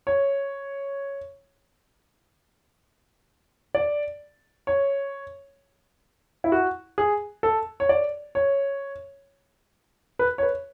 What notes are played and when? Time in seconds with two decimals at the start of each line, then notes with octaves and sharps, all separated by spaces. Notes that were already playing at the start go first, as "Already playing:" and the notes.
0.07 C#5
3.75 D5
4.67 C#5
6.44 E4
6.52 F#4
6.98 G#4
7.43 A4
7.80 C#5
7.89 D5
8.35 C#5
10.19 B4
10.38 C#5
10.43 B4